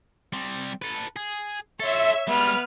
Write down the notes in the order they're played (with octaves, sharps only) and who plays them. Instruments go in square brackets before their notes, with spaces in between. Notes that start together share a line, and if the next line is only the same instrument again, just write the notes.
[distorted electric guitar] G3 C4
A4 B4
G#4
[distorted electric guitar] A4 C5 [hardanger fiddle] C#5 [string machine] E5
[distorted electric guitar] G3 G#3 [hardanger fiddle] B3 B4 [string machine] F6